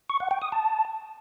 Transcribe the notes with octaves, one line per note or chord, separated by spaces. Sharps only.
C#6
F#5
G5
D#6
A5